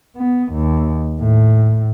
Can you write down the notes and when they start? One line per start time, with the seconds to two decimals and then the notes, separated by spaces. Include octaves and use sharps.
0.16 B3
0.52 D#2
1.20 A2